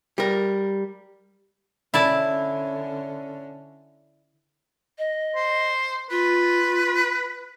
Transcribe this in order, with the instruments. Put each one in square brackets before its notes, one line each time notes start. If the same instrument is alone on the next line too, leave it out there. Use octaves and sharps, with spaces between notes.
[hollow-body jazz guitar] G3 A#4
[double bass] D3 C#4 [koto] E4 D5 A5
[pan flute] D#5
[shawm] C5
[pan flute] F4 [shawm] B4